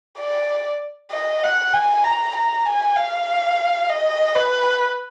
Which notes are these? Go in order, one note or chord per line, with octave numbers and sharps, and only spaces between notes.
D5
D#5
F#5
G#5
A#5
A#5
G#5
F5
D#5
B4